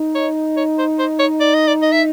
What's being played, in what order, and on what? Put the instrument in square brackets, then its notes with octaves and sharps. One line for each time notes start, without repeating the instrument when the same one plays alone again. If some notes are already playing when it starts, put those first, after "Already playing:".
Already playing: [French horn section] D#4
[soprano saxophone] C#5
C#5
C5
C5
C#5
D5
D#5
D5
D#5
E5